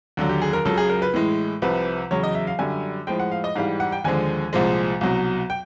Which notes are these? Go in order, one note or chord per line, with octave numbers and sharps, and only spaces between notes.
D#2 D3 F#3
G4
G#4
A#4
C#2 C#3 F#3 A4
G#4
A#4
B4
A2 E3 G#3
C2 C3 F3 B4
E2 C#3 F#3 C#5
D#5
E5
F5
F#2 D3 G3 G#5
A2 F3 G#3 G5
F#5
F5
D#5
G#2 E3 G3 F5
F#5
G5
D#2 D3 F3 G#3 G#5
C2 A#2 F3 G#3
C2 B2 F#3
G5